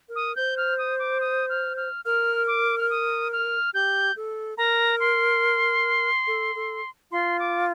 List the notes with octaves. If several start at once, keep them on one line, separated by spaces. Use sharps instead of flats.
A#4
D#6
C5 G6
F6
D#6
D6
D#6
F6
F6
A#4 F6
D6
F6
D#6
F6
G4 G6
A4
A#4 A#5
C6
A4
A4
F4 C6
D6